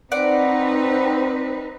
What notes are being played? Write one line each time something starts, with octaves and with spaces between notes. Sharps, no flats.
C4 D#4 B4 D5 F#5